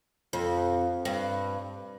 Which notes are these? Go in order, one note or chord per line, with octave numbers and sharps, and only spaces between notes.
F2
G2